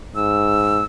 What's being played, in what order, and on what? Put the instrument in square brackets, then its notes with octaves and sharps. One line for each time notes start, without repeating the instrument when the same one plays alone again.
[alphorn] G#2 [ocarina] E6